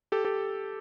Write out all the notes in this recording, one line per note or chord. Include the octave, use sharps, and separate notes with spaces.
G4 A4
G4 A4